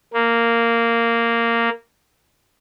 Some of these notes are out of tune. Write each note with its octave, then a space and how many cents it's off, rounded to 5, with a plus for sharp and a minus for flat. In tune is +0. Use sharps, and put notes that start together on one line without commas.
A#3 -10